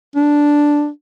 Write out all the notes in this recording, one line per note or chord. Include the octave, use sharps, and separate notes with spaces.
D4